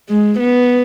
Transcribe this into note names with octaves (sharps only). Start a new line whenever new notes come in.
G#3
B3